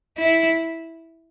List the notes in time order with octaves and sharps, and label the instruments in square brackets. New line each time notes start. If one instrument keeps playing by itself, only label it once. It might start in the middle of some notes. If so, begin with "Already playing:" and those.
[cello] E4